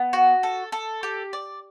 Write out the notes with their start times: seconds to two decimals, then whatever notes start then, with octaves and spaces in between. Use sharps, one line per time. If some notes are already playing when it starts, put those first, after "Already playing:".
Already playing: B3
0.13 F#4
0.43 A4
0.72 A4
1.03 G4
1.33 D5